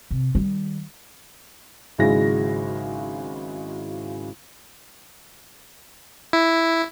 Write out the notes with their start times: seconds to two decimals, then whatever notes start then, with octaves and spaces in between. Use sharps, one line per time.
0.11 C3
0.35 D#3 G3
1.98 G#1 C#3 F#3 G#3 E4 A#6
6.33 E4